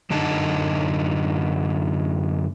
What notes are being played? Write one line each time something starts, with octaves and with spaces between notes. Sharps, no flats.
F#2 D3 D#4 A5